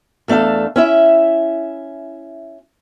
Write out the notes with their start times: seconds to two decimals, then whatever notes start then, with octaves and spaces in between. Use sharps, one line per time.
0.28 E2 A3 D4 A4 F5
0.76 C#4 E4 E5